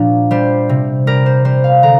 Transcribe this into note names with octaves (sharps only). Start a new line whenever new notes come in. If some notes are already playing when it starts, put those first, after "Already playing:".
Already playing: A#2 F3 D4
G3 C5
C3
G3 A#4
C5
G3 C5
F5
D3 A#5